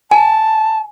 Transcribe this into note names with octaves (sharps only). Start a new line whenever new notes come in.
G#5 A5